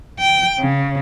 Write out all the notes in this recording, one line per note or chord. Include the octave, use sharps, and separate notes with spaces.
G5
C#3